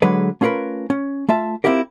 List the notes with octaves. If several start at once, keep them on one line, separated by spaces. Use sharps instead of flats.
D3 F#3 G#3 G#4 B4
A3 C#4 F4 G#4 A#4 B4
C#4
A3 F4 E5 A5
C4 C#4 E4 F4 G4 A#4